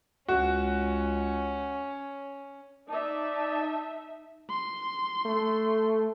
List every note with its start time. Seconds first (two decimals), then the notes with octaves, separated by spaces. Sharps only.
0.28 C#2 C#4 F#4
2.89 D#4 D5 E5 A5
4.50 C6
5.25 A3